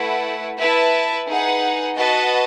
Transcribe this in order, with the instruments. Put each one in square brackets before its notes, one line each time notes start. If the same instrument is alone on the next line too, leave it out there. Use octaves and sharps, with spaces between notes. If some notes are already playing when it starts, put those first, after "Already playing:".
Already playing: [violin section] A3 E4 B4 F#5
E4 B4 E5 A5
D#4 G#4 B4 F#5
F#4 B4 D#5 F#5 A5